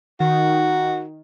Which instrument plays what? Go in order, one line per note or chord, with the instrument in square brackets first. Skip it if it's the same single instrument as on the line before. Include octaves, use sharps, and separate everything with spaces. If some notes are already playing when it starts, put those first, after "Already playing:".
[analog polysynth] D#3 [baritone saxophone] F#4